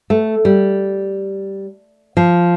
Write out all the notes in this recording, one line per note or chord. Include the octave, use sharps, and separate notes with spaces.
A3
G3
F3